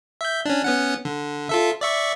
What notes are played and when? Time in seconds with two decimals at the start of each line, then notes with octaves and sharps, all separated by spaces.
0.21 E5 G6
0.45 C#4 D4
0.64 B3 C#4 F#5
1.05 D3
1.49 F4 A4 E5
1.81 D5 E5 C#6